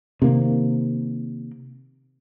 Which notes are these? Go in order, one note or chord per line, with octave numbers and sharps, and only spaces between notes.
C3 D#3 A#3